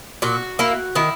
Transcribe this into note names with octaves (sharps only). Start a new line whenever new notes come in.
A#2 F#4
A#3 E4
D#3 E4